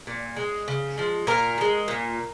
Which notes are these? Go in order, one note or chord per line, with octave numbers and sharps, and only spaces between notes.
A#2
G#3
C#3
F3 G#3
A#2 A#4
F3
G#3
A#2